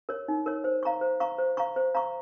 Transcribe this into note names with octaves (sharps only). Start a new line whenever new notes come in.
A#4 C#5
D#4
A#4 C#5
C5
F5 A#5 C#6
C5
F5 A#5 C#6
C5
F5 A#5 C#6
C5
F5 A#5 C#6